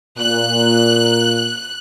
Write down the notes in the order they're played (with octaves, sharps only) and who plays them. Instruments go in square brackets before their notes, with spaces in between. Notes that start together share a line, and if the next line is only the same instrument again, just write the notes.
[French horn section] A#2 [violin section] F#6